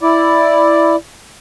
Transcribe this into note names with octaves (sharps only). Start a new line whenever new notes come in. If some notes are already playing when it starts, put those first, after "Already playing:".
E4 D5